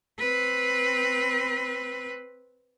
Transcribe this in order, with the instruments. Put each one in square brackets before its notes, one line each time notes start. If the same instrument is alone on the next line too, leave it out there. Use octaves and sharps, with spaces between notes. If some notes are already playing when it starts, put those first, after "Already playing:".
[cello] C4 B4